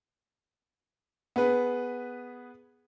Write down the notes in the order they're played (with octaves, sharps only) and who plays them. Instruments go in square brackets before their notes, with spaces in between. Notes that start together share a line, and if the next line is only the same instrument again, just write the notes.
[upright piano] B3 G#4 B4